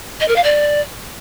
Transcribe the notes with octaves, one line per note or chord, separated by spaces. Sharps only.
D#5
A#4
F5
D5